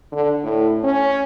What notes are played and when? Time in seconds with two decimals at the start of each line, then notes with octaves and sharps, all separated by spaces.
0.12 D3
0.43 A2
0.84 C#4